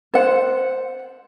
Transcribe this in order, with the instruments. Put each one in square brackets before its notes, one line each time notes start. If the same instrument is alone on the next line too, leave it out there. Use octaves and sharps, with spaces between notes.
[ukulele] C5 F#5